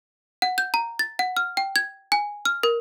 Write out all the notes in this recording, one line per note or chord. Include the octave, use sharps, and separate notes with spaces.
F#5
G6
A#5
A6
F#5
F6
G5
G#6
G#5
F6
A#4